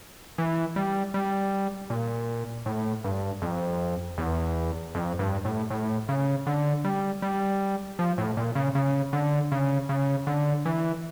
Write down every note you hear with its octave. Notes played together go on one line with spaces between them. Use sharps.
E3
G3
G3
A#2
A2
G2
F2
E2
F2
G2
A2
A2
C#3
D3
G3
G3
F3
A2
A#2
C#3
C#3
D3
C#3
C#3
D3
E3